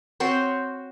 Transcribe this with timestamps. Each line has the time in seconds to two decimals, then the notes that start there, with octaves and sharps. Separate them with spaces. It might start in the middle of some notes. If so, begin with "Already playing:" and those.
0.20 C4 F#4 C5 C#5